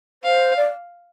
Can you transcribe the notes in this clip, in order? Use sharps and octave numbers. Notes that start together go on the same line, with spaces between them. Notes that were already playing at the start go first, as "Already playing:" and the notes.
C5 F5
D5